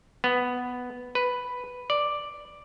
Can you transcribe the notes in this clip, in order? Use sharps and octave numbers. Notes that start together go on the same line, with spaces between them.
B3
B4
D5